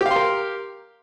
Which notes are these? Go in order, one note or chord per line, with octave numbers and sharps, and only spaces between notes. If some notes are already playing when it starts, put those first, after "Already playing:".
G4 A#4 F5 C6